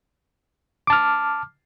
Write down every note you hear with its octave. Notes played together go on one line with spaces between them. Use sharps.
A5 D6 F6